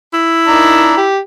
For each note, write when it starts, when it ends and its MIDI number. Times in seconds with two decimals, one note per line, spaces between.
0.13 1.09 64
0.48 0.94 51
0.48 0.94 62
0.48 0.94 82
0.97 1.19 67